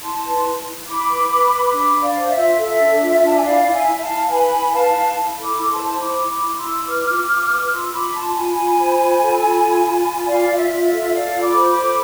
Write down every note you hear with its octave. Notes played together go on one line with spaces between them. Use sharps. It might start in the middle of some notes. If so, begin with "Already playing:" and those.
E4 A5 C6
B4
E4
E4
E4 B5 D6
B4
B4
B4
D4 B5 D6
D4
D5 F5
C5
E5
F4
A4 E5
D4
F4
D4 A5
G#5
E4 D5 F5
E4
E5 G#5
E4
F5 A5
E4
B4 G#5 B5
E4
B4 F5 A5
E4
E4
A4
B5 D6
E4
A5 C6
C5
E4 B5 D6
E4
B5 D6
E4
C6 E6
E4
B4 D6 F6
F4
F4
B4
F4 C6 E6
F4 B5 D6
F4 A5 C6
F4 G#5 B5
F4
C5
F4
A4
F4
F4
F4
F4
F4 D5 F5
F4
E5
F4
E5
A4
A4 D5 F5
F4
B5 D6
C5
B5 D6
A4